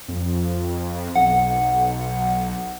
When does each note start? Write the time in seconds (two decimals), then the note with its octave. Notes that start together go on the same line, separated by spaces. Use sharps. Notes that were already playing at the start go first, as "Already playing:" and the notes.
0.08 F2
1.15 B1 F#5